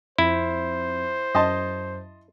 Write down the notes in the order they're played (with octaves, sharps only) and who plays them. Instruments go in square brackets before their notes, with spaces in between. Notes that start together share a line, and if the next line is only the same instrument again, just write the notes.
[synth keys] F2 [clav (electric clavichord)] E4 [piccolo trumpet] C5
[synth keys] F#2 [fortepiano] D#5 A5 C6